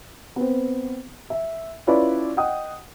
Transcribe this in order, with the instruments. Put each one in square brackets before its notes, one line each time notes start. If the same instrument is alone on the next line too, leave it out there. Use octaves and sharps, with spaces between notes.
[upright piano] B3 C4
E5
C#4 E4 F4 B4 D5
D#5 F#5 G5 D#6